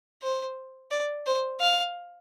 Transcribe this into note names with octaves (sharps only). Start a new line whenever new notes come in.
C5
D5
C5
F5